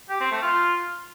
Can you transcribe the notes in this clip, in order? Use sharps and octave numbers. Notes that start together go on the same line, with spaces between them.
G4
C4
A3
F4